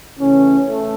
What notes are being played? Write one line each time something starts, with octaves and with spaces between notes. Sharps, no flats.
C#3 E3 A3 C#4
A3